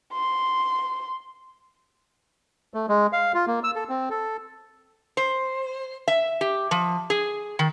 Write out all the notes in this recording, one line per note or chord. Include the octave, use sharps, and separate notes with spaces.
C6
A3
G#3
F5
F4
A#3
E6
A4
C4
A4
C5
E5
G4
F3
G#4
D#3